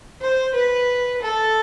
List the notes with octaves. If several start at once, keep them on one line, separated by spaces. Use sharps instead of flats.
C5
B4
A4